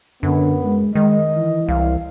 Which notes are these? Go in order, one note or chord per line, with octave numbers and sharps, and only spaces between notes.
F#2 D3 B3
G#3
D#3 G#3 D#5
E3
C2 F5